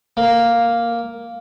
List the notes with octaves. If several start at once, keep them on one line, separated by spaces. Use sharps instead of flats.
A#3